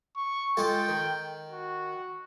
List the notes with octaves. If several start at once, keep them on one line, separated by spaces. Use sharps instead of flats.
C#6
G#3 F4 A4 G5
D#3
F#4